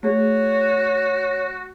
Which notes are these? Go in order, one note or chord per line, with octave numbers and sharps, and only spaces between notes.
A3 F#4 G#4 C#5